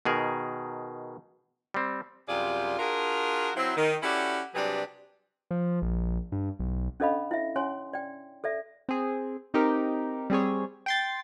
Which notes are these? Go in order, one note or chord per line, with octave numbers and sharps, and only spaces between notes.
B2 D#3 G#4 A#4
G3 C4
F#2 C3 G3 F4 G#4 D5
D4 F4 F#4 G#4 A#4
F#3 C4 E4
D#3
C#4 E4 F#4 G4 A4 D5
C3 F#3 G3 D4 G#4 B4
F3
A#1
G2
B1
C#4 D4 A4 D#5 F5 B5
E4 E5
C#4 C#5 G#5 C6
D5 G5
A4 D5 E5
C4 G#4
C4 D#4 G4 A#4
G3 C4 G#4 C#5
G5 C6 A6